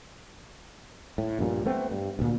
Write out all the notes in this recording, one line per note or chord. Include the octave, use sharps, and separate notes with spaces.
A2
A#1 G2 A#2
A3 B3 C4
G2
D2 A#2